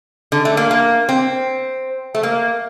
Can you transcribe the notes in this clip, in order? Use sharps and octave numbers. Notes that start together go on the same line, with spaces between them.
D3
A3
A#3
A#3
C4
A3
A#3